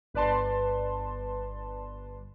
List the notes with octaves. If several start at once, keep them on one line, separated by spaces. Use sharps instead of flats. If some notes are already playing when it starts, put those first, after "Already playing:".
G1 B4 D5 A5 C6